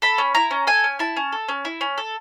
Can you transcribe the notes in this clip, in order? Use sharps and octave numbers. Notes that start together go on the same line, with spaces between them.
A4 B5
C#4
E4 A#5
C#4
A4 G#5
C#4
E4 A5
C#4
A4
C#4
E4
C#4
A4